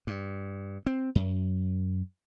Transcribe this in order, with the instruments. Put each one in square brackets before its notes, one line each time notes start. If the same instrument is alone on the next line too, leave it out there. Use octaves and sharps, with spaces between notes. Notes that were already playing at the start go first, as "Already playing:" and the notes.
[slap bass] G2
C4
F#2